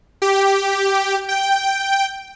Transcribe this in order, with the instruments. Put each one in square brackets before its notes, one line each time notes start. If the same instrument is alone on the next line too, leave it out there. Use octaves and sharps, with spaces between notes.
[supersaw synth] G4
G5